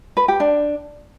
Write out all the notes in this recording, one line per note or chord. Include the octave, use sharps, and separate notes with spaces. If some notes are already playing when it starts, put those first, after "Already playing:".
B4
G4
D4